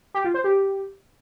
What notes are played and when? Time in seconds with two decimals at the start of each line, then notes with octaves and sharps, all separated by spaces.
0.14 G4
0.24 F4
0.34 C5
0.44 G4